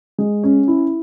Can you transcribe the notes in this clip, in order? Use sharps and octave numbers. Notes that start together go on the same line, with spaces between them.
G#3
C#4
E4